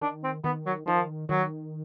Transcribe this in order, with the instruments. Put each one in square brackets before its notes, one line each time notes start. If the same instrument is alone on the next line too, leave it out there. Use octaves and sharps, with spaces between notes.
[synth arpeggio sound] D#3 [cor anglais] D4
[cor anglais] C4
[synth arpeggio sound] D#3 [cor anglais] B3
[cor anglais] F#3
[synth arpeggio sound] D#3 [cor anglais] F3
[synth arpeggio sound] D#3 [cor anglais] F#3